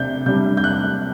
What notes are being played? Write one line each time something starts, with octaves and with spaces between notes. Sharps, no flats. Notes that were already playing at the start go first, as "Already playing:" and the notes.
Already playing: C3 D4 G6
C3 G3 D4 G6
G6
F#6